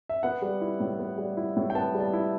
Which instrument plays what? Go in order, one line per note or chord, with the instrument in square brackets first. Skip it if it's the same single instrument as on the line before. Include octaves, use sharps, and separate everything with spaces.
[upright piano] E5
B3 F#5
G3
E4
A2
B3
G3
E4
A2
G5
B3 A5
G3
A5
E4